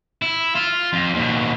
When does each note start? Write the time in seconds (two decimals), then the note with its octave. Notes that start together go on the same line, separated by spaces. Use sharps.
0.22 E4
0.55 F4
0.93 F2
1.14 D#2 B2